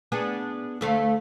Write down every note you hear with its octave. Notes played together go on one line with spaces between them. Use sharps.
B3 D4 G#4
D2 A3 F5